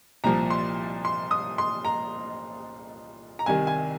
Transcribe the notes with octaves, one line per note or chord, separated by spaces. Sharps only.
C2 A#2 F3 A#5
C6
C6
D#6
C6
A#5
A#5
C2 C3 D#3 G#5
G#5